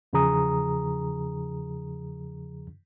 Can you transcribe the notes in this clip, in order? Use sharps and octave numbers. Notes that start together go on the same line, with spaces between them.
E2 C#3 F3 G#4 A#5 D#6